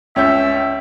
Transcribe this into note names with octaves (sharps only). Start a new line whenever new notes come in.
C#2 C#4 E5 G6